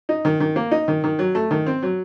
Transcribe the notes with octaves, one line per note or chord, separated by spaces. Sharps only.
D#4
D#3
D#3
A#3
D#4
D#3
D#3
F#3
A3
D#3
C4
F#3